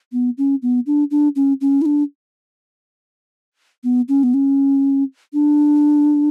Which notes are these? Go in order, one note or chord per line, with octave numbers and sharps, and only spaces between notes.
B3
C#4
B3
D4
D4
C#4
C#4
E4
D4
B3
C#4
B3
C#4
D4